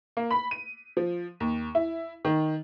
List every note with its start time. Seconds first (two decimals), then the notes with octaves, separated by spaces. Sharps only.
0.17 A#3
0.31 B5
0.51 D#7
0.97 F3
1.40 D#2
1.75 E4
2.25 D#3